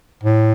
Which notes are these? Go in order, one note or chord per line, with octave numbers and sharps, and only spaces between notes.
A2